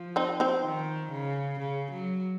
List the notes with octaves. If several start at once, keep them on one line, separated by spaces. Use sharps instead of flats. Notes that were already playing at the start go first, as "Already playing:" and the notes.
Already playing: F3
C4 D#4
C4 D#4
D#3
C#3
C#3
F#3